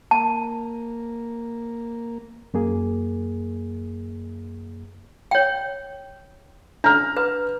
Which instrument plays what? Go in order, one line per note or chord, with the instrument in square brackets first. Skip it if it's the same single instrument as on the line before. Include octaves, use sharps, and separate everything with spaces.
[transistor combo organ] A#3 [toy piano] A5
[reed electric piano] F#2 A#3 G#4
[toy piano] C#5 G5
[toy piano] D4 [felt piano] A#5 F6
[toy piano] B4